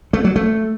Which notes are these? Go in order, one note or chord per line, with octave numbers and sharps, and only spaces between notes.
A3
F#3
A3